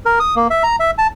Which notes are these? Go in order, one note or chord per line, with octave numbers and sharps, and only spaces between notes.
A#4
D#6
A#3
E5
A#5
E5
A5